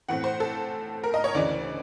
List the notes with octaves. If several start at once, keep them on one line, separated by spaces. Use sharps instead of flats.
A2 E3 A3 C4 F#5
C5
A4
A#4
D#5
C#5
D2 C#3 E3 D5